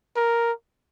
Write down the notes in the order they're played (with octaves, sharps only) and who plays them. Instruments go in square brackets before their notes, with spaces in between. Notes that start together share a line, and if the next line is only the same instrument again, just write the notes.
[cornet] A#4